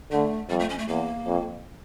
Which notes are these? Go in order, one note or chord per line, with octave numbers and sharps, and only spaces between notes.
D3 A3
F2 G3
A3
C#4
A3
E2 A#3
F2